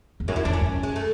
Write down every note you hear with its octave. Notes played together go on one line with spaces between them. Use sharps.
E2
F#2 G#3
E4
E2 D4
C#4
F#2
G#3
A3